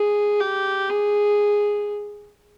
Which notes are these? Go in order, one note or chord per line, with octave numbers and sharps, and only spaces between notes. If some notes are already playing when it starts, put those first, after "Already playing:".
Already playing: G#4
G4
G#4